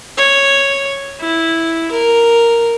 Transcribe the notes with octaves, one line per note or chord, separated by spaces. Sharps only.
C#5
E4
A#4